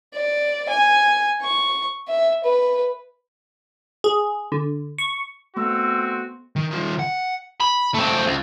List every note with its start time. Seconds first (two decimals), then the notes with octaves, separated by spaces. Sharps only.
0.14 D5
0.69 G#5
1.42 C#6
2.08 E5
2.44 B4
4.04 G#4
4.52 D3
4.98 C#6
5.57 A3 B3 C4 F#4 E6
6.56 D#3
6.71 D#3 F4
6.99 F#5
7.60 B5
7.94 A3 C4
8.26 C#2